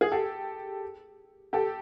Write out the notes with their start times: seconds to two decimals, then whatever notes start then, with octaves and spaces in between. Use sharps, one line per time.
0.01 G#4
0.12 G4 A4
1.53 G4 A4